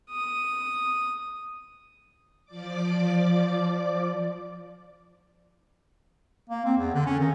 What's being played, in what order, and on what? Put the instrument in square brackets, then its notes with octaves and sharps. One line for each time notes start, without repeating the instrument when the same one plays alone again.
[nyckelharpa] D#6
[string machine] F3 D5 D6
[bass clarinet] A#3
C4
E2
D3
C#4
D#3